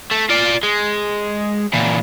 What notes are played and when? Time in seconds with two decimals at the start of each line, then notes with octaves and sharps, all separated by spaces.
0.11 A3
0.30 F4 D5
0.63 G#3
1.73 A#2 E3